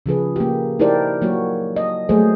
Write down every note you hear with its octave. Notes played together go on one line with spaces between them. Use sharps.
C#3 F3 G#4 B4
A#3 G4
D#4 E4 G4 A#4 C5 D5
F#3 A#3 F#4 C#5
D#5
F#3 G3 A3 A#3 G#4 C5